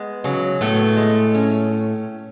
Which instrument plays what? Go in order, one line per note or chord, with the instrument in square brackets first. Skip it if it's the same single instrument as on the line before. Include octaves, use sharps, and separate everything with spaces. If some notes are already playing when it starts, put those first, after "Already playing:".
Already playing: [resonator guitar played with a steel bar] G#3 B3
[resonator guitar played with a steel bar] C#3 [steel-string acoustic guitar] F#3
[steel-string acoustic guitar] A2 A3 [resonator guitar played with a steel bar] B3
[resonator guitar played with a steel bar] G#3
C#4